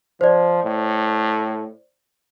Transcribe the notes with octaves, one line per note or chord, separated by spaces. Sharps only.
F3 C5 D5
A2